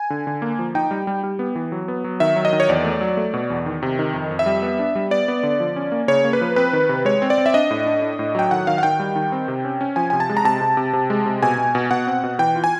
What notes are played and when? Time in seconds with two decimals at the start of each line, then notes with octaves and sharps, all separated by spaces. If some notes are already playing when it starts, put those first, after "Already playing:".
Already playing: G#5
0.10 D3
0.27 D3
0.42 A#3
0.59 F3
0.75 D#4 G5
0.91 G3
1.07 G3
1.24 G3
1.39 B3
1.55 E3
1.72 F#3
1.88 B3
2.04 F#3
2.20 D#3 E5
2.36 F#3
2.45 D#5
2.53 D#3
2.60 C#5
2.69 E2 D5
2.85 A3
3.01 F#3
3.17 A3
3.34 B2
3.50 E2
3.66 D#3
3.82 C3
3.99 D#3
4.14 F2
4.31 F2
4.39 E5
4.46 G3
4.63 B3
4.79 D4
4.95 G3
5.11 B3 D5
5.28 B3
5.43 D3
5.60 F3
5.76 C#4
5.92 A#3
6.08 C#3 C#5
6.24 A#3
6.33 B4
6.41 F3
6.56 C4 B4
6.73 D#3
6.89 C3
7.05 G#3 C#5
7.22 C4
7.30 D5
7.38 C4
7.46 E5
7.54 D4 D#5
7.71 A2
7.86 D4
8.02 D4
8.19 A2
8.35 F#3 G5
8.51 D#3 F#5
8.67 D#3 F5
8.78 F#5
8.83 D#3 G5
9.00 G3
9.16 D#3
9.32 C4
9.48 C3
9.65 C#4
9.81 C#4
9.96 F3 G#5
10.10 C3 G#5
10.20 A5
10.29 G#3
10.37 A#5
10.44 C3 A5
10.61 C3
10.77 C3
10.93 C3
11.10 G#3
11.26 C3
11.43 B2 G#5
11.58 B2
11.75 B2
11.91 B2 F#5
12.07 C4
12.24 B2
12.39 E3 G5
12.56 F4
12.64 G#5